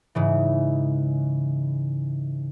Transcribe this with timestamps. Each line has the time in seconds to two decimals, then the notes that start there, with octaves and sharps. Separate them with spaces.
0.15 G#2 C#3 E3